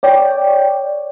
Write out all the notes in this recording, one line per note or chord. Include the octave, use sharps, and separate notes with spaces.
C#5 D5 G5